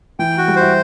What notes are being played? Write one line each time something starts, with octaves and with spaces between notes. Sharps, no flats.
E3 G5
F#4
G3
C5
E4